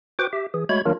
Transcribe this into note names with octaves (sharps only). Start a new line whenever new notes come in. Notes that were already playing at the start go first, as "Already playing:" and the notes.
F#4 B4 C5 G5 D6
G4 E5
E3 G#4
G#3 A3 F#4 C#5 B5 G#6
D#3 F#3 A#3 D4 F4 A#4